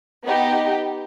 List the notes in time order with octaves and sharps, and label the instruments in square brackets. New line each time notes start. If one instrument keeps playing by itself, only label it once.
[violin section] B3 D#4 G4